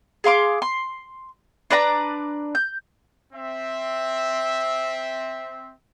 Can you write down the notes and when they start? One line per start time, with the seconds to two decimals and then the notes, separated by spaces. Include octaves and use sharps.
0.24 G#4 F5 C6 D6
0.62 C6
1.71 D4 B4 D5 A#5
2.55 G6
3.33 C4 E5